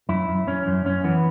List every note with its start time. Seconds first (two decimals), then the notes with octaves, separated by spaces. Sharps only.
0.09 F#2 E4
0.29 F#2
0.47 F#2 C#4
0.67 F#2
0.85 F#2 C#4
1.04 E3 B3